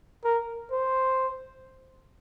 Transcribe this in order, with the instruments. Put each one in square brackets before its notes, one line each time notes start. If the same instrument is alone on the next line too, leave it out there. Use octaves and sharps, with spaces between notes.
[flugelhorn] A#4
C5